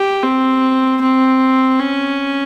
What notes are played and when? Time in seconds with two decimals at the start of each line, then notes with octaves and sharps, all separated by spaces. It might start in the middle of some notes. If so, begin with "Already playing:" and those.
Already playing: G4
0.23 C4
1.01 C4
1.79 C#4